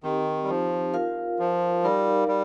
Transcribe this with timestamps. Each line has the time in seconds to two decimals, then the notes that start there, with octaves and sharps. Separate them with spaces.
0.04 D#3 C4 D#4 G4
0.43 G3
0.49 F3
0.94 F4 A#4 F5
1.39 F3
1.84 G3 D#4 A#4 F5
2.28 G3